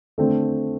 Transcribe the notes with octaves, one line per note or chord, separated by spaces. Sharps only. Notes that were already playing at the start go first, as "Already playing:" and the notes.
D3 A3 C4